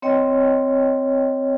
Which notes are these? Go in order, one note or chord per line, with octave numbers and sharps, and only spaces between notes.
C4 C#5 D#5 G5